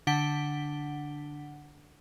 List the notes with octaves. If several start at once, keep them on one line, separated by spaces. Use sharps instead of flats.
D3 D4 F#5 B6 G7